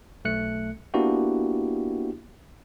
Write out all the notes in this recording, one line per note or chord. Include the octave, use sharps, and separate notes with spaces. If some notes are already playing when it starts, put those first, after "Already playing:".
B1 A3 F#6 C#7
A#3 B3 D4 E4 F#4 G4